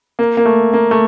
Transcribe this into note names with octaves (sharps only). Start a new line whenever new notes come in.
A#3
A#3
A3
A#3
A3